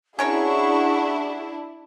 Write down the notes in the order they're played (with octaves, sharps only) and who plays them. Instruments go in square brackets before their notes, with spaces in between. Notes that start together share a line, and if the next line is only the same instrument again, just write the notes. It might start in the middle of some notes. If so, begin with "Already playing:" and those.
[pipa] C#4 A#4 C#5 [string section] D4 E4 [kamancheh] F#4 G#4 [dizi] C#6